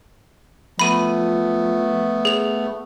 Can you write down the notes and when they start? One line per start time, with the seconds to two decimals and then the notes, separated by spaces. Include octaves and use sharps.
0.79 F3 A3 B3 B5 D#7
2.25 G#4 F7